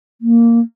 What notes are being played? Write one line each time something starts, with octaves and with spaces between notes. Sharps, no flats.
A#3